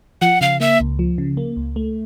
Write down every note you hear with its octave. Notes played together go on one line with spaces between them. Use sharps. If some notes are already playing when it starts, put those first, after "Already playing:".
F3 F#5
C#3 F5
A#3 E5
C#2
F3
C#3
A#3
C#2
A3